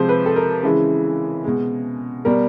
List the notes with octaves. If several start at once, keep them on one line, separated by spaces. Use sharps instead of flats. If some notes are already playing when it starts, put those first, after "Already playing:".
Already playing: C3 F3 G#3 C5
B4
A4
A#4
C#3 E3 G#3
B2 G#3
B2 G3 A#4